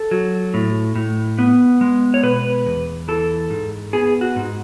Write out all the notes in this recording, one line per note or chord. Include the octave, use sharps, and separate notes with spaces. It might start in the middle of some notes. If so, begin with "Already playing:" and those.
Already playing: A4
F#3
A2
A2
B3
G#3
C#5
B2 B4
E2
E3 A4
G#2
B3 G#4
F#4
G#2